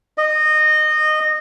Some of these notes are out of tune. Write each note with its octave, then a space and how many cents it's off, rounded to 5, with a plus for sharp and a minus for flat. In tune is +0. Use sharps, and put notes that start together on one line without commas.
D#5 -20